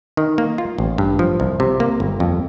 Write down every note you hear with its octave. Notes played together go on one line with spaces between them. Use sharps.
D#3
A#3
F4
A1
G2
F3
C2
C3
A#3
G1
F2